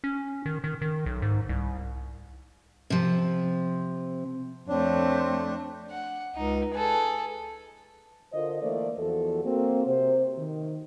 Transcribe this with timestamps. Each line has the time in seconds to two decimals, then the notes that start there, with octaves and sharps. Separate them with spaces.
0.04 C#4
0.46 D#3
0.64 D#3
0.81 D#3
1.06 B1
1.22 G#2
1.49 C2
2.90 C3 F3
4.69 F2 A3 C4 D4 C#5
5.90 F#5
6.36 C#2 D#4
6.74 G#4 A4 B4
8.33 D3 F4 A#4 C5 D#5
8.62 E3 A3 A#3 A4 C5 D5
8.99 E2 E3 F3 F#4 A4
9.44 A#3 C4 F#4
9.86 C3 C5
10.37 D#3